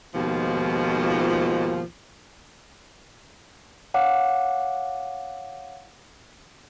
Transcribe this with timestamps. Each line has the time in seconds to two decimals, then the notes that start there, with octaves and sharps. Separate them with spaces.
0.14 D#2 G#2 B2 F3
3.94 C#5 F5 F#5 D6